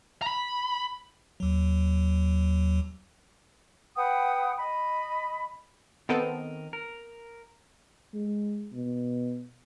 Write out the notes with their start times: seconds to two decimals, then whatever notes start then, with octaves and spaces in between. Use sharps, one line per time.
0.22 A#5 B5
1.40 D#2 F#3
3.96 B4 F#5 G5 D#6
4.58 D#5 B5
6.09 D#3 B3 C4 A4 A#4 D#5
6.73 A#4
8.14 G#3
8.73 B2